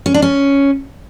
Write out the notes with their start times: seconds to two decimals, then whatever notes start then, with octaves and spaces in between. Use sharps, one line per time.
0.06 C#4
0.14 D4
0.22 C#4